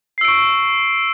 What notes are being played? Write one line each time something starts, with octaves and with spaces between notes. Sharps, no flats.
C#6 E6 C7 D7